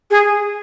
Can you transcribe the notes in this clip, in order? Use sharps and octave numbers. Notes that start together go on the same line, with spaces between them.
G#4